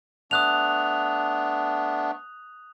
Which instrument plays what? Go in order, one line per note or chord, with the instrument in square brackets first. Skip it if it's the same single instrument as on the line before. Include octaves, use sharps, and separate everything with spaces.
[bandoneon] A3 B3 D4 [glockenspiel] D#6 F#6 F7